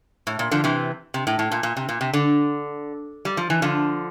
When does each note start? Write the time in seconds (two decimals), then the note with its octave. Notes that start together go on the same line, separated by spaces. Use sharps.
0.27 A2
0.39 A#2
0.51 D3 F3
0.64 C3 E3
1.14 C3
1.27 A2
1.39 A2
1.52 A#2
1.63 A#2
1.77 C3
1.89 A#2
2.01 C3
2.13 D3
3.25 G3
3.37 F3
3.50 E3
3.62 D3 F3